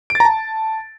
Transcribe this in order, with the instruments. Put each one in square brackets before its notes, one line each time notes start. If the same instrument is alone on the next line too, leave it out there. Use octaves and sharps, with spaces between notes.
[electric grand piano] D7
A6
A#5
A5